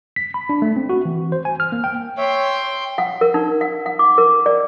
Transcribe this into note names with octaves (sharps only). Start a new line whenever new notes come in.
B6
B5
D4
A3
C4
F#4
E3
C5
G#5
F6
A#3
G5
C#5 E5 G5 C6
F#5
A#4
D#4
F#5
F#5
D6
A#4
D5